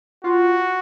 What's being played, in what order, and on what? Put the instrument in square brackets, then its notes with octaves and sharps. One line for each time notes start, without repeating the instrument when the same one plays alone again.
[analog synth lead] F4 [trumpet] F#4